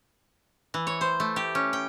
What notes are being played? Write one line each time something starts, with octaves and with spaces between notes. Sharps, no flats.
E3
C#5
C5
A3
G4
C#4
G5